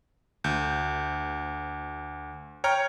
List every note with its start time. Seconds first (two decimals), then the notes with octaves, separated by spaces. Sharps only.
0.44 D2 G6
2.64 C#5 G5 A#5 F6